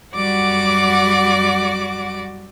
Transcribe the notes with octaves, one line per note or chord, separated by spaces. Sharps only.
F#2 G3 F#4 D5 F#5 D6